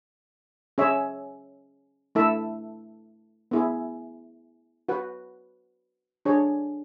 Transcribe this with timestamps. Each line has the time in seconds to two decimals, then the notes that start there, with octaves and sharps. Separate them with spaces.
0.78 C#4 G#4 C#5 E5
2.15 A3 E4 A4 E5
3.51 B3 E4 G#4
4.89 F#4 B4 F#5
6.25 D4 G#4 C#5